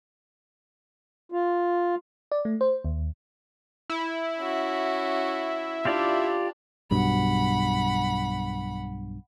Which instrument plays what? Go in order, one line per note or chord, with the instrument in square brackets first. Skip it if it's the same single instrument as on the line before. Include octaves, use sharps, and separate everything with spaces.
[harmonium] F4
[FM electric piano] D5
A3
C5
D#2
[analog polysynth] E4
[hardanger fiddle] C#4 F#4
[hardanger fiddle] D4 [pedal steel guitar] F4 G4 D5
[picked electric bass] B1 G2 B2 [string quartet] F#5 B5